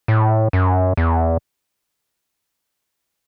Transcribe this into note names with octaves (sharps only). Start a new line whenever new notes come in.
A2
F#2
E2